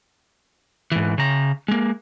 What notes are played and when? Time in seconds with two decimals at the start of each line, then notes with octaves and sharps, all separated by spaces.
0.92 G#2 E3
1.18 C#3 A#5
1.68 G#3 A#3